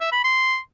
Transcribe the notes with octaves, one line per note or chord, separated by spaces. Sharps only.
E5
B5
C6